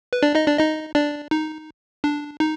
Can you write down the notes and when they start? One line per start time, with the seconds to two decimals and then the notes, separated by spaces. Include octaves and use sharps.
0.13 B4
0.22 D4 D5
0.35 D#4 D#5
0.46 D4 D5
0.58 D#4 D#5
0.95 D4 D5
1.31 D#4
2.04 D4
2.40 D#4